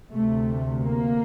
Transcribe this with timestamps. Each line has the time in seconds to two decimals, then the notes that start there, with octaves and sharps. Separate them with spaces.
0.13 D2 C3 A3
0.82 A#3